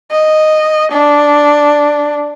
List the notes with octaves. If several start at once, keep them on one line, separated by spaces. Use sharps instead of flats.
D#5
D4